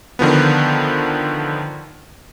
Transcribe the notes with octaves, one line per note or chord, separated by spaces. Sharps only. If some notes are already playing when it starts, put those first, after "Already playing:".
D3 D#3 F3 B3